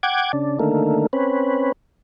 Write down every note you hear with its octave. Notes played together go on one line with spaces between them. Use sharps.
F#5 G5 D6 G#6
C#3 D4
D3 D#3 A3 A#3
C4 C#4 B4